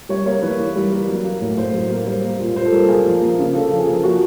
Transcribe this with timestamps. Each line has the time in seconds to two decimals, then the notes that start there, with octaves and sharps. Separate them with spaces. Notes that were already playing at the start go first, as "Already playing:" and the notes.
0.09 G3 C#5
0.26 A#3 C#5
0.42 E3 B4
0.59 E3
0.76 G3
0.92 A#3
1.09 F#3
1.25 A#3
1.41 A2
1.57 A2 C5
1.73 F#3
1.91 A#3
2.06 G3 C5
2.24 A#3
2.40 A#2
2.56 A#2 C5
2.65 A4
2.72 G3 A#4
2.88 A#3 G#4
3.06 F3
3.22 A#3
3.39 C#3
3.55 C#3 A4
3.71 F3
3.79 G#4
3.88 A#3
4.03 F3 F#4